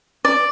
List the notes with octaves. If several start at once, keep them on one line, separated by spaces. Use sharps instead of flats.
D5